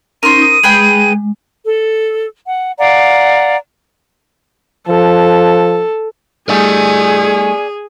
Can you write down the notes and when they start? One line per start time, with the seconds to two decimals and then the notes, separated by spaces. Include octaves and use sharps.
0.23 C#4 D#4 A#4 C5 D#7
0.41 D#6
0.63 G#3 G#4 B4 G5
1.67 A4
2.46 F#5
2.79 D5 F5 F#5 A#5
4.88 F3 A4
6.49 G3 A3 D#4 G#4 D5 G#5